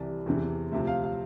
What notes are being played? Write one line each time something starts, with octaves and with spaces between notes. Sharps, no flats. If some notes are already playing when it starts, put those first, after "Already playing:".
Already playing: C2 C3 E3 D5
E2 C3 E3
D2 C3 F3 E5
F5
F5